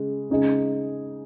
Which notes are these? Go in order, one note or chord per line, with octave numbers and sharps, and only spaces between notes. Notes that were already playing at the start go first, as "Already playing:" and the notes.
Already playing: C#3 G#3
C#3 G#3 D#4 G#4